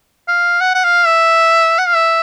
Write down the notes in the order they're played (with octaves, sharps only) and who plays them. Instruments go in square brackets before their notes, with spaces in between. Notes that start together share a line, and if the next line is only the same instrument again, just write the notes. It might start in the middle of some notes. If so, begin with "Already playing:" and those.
[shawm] F5
F#5
F#5
F5
E5
F#5
F5
E5